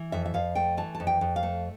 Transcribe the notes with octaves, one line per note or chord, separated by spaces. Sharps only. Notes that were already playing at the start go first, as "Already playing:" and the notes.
Already playing: E3
F2 E5
E5
F2 F5
A3 G5
E3 A5
A5
F2
G5
F2
F5
A3